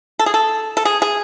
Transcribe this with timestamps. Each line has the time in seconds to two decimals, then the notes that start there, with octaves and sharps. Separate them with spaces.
0.19 A4
0.26 G#4
0.34 A4
0.77 A4
0.85 G#4
1.02 G#4